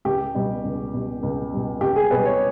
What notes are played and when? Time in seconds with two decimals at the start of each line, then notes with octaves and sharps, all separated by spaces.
0.05 C#2 G4
0.35 B2 G3
0.64 C#2
0.93 B2 G3
1.23 C#2
1.52 B2 G3
1.81 C#2 G4
1.96 G#4
2.11 B2 G3 B4
2.25 C#5